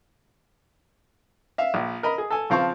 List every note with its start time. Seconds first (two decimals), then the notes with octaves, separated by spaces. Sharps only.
1.58 E5 F5
1.74 A#1
2.03 A#4 D#5 B5
2.18 G#4
2.30 A4 G#5
2.50 C#3 F3 C4 F5 A5 C#6